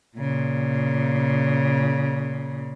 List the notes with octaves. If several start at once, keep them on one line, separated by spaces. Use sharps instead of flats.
A#2 C#3